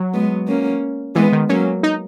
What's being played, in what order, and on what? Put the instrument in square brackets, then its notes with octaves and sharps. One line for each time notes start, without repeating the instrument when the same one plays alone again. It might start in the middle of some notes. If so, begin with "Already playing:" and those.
Already playing: [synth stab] F#3
[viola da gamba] G#3 B3
A#3 C#4
[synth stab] E3 [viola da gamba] G#3 B3
[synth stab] D#3
[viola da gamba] F#3 A#3 [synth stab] C#4
[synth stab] D#4